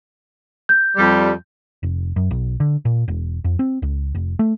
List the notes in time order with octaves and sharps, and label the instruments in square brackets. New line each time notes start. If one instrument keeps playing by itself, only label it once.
[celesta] G6
[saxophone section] F2 G3
[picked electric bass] F1
F#2
B1
D3
A#2
E1
F2
C4
C#2
F1
A3